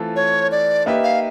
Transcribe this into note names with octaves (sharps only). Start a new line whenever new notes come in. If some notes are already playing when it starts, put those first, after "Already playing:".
Already playing: E3 A3 C4 F4 A4
C#5
D5
A#3 D#4 G4 B4 E5
F5